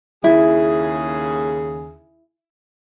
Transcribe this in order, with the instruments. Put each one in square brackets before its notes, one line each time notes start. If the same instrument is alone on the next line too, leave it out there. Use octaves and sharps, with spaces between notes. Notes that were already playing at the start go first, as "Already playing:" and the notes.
[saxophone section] D#2 C#3 G#4 [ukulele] E4